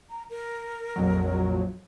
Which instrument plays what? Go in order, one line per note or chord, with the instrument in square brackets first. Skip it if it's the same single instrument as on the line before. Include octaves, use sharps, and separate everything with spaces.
[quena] A#5
A#4
[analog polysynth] A#1 F2 F#3